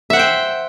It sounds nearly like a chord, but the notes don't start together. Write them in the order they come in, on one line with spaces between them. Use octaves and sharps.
E5 F#5 C5 G5